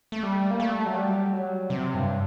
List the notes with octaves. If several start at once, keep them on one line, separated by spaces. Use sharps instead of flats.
A3
G3
A#3
A3
F#3
G3
F#3
C3
G2